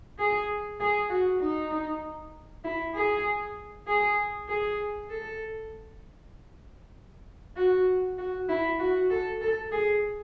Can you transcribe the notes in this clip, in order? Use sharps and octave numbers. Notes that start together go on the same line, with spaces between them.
G#4
G#4
F#4
D#4
E4
G#4
G#4
G#4
A4
F#4
F#4
E4
F#4
A4
A4
G#4